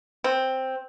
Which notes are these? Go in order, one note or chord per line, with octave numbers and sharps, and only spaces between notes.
C4